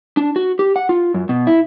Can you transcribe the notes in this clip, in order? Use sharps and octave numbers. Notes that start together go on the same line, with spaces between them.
D4
F#4
G4
F#5
F4
F#2
B2
E4